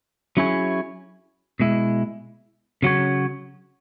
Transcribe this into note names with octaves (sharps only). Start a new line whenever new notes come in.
F#3 C#4 E4 G#4 C#5
B2 G#3 E4
C#3 F#3 C#4 F#4 C#5